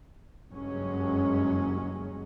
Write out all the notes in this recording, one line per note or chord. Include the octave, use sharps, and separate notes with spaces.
F#1 G2 F#3 G#3 C#4